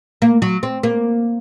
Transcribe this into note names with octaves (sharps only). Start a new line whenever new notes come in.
A#3
F#3
C4
A#3